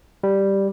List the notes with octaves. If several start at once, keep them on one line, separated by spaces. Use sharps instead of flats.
G3